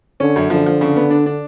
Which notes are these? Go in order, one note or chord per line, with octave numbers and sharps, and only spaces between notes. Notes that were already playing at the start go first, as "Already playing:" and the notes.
D3 C#4
F#2
D3 F3
F3
C#3
B3
D4
D4